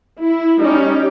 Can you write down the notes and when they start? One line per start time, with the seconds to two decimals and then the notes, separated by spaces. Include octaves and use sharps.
0.19 E4
0.59 G3 C#4 D#4 G4